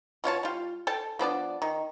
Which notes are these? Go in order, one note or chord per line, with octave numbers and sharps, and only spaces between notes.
B2 F4 C#5 A5
G3 F4
A4 G5 A5
F3 B3 D4 D5
D#3